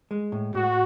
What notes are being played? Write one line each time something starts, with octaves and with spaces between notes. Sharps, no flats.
G#3
A2
A2 F#4